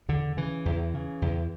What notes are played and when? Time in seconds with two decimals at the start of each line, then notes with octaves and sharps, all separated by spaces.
0.09 E2 D3
0.37 C#3 E3
0.65 E2
0.94 C#3
1.22 E2